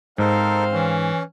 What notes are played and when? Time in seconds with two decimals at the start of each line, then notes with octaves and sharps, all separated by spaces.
0.18 G#2 C4 D#4 A4 A#4 C5 F5
0.72 E3 C#4